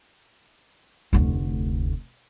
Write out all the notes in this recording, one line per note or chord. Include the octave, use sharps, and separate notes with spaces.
F1 D2